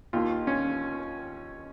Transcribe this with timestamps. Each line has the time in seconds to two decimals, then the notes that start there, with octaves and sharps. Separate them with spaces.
0.13 D#2 D#3 F4
0.47 C#4